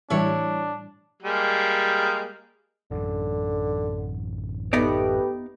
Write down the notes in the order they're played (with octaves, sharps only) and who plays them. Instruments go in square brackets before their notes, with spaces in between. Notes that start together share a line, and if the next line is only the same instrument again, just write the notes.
[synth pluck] A2 E3 G3 [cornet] D4 [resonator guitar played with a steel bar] E4 C#5
[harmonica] G3 G#3 A#3
[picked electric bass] A1 F#2 [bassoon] D3
[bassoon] A3 [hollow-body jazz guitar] B3 D#4 D5 [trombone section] G4 B4